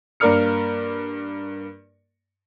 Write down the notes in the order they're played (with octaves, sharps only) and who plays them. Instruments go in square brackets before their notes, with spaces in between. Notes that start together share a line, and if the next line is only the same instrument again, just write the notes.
[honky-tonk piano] G2 A#3 A#4 D5 F6 C#7